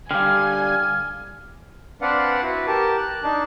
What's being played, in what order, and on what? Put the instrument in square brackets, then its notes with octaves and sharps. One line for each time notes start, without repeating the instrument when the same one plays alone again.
[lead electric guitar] D3 G3 [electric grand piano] F5 G5 [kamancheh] G#5 [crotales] F6
[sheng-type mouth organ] C4 D4 B4 D5 F5 F#5
E4 F#4 B4
G4 A#4 A5
F#6
D4 D#4 A5